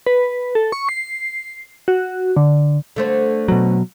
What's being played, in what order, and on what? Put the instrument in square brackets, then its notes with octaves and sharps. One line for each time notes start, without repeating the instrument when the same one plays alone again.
[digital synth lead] B4
A4
C#6
C7
F#4
D3
[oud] D3 A3 C5
[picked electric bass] B2 F#3